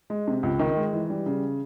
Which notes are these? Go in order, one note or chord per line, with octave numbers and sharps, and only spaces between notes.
G#3
C3
C#2
D#3
G#3
E3
G3
C#3